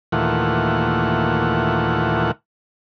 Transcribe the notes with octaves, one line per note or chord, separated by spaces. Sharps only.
D#2 A#2 E3 A3 F4 F#5